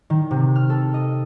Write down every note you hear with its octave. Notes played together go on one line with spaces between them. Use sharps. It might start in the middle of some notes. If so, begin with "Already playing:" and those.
D#3
C3
F6
A4
D#5